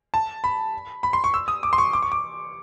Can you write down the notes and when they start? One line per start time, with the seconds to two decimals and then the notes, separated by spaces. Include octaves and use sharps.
0.14 A5
0.44 B5
1.03 B5
1.13 C6
1.24 C#6
1.34 E6
1.48 D#6
1.63 D6
1.73 C6
1.78 C#6
1.93 D6
2.02 C#6
2.12 D6